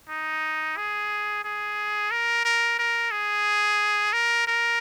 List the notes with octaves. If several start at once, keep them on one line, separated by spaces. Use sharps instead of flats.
D#4
G#4
G#4
A#4
A#4
A#4
G#4
A#4
A#4